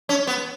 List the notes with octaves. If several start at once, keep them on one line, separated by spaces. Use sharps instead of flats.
C#4
B3